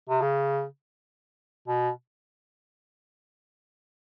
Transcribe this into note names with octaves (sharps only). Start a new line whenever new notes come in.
C3
C#3
B2